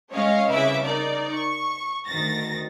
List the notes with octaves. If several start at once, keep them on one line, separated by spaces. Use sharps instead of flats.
G#3 C#4 C#5 D#5 F5
C2 C#3 E4 B4 E5 D6
D#4 A#4 D5
C#6
D2 D#3 A6 A#6